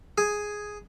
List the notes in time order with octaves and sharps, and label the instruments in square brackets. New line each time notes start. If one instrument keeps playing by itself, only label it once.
[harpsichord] G#4